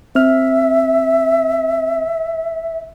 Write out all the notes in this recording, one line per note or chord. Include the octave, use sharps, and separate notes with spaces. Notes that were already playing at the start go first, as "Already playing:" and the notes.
C4 E5 F6